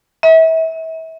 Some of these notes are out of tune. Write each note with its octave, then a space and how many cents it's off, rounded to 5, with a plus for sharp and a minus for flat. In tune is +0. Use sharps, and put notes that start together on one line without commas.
E5 -30